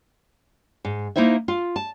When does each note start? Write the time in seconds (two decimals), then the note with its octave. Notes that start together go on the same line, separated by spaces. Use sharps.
0.85 G#2
1.16 A#3 D#4 E4 C5 E5
1.48 F4
1.76 A5